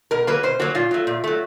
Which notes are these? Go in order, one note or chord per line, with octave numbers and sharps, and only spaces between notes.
B2 A#4
F#3 A#3 B4
B2 C5
F#3 A#3 F#4
A#2 F4
F#3 A3
A#2
F#3 A3